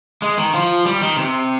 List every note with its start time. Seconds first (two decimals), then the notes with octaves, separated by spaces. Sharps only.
0.22 G#3
0.38 D#3
0.54 F3
0.85 G3
1.01 D#3
1.17 C3